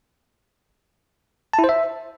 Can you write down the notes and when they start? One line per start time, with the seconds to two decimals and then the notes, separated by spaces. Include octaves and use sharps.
1.53 A5
1.59 E4
1.64 C5
1.69 E5